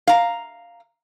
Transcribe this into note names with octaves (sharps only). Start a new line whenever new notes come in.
F5 A#5